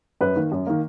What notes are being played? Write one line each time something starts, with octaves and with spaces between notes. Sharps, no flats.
F#2 B4
D#3 A#3
F#2
D#3 A#3